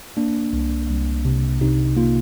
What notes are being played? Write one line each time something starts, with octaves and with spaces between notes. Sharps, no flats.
A#3 D4
C2
C2
C3
C3 D#4
A#3 F4